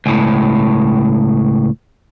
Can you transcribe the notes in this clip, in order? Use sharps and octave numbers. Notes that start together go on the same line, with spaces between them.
C#2 A2